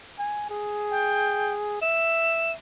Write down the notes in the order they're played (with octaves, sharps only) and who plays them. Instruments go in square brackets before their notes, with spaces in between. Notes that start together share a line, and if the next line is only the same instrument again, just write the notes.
[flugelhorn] G#5
G#4
[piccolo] G5
[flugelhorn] E5 [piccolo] E7